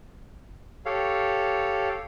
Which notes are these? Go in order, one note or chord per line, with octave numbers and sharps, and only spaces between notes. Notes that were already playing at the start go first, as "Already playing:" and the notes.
G4 A4 C#5 F5